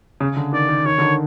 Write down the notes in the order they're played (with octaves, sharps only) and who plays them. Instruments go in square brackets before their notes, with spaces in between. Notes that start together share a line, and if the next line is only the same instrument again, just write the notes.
[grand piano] C#3
D3
[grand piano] D#3 [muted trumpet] D5
[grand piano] D#3
[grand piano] D#3 [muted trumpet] C#5
[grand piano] D3
D#3